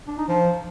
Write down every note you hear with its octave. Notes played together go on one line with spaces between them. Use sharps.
D4
D#4
F3